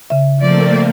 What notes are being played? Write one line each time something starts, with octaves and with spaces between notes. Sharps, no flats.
C#3 E5
F3 A3 A#3 C4 D5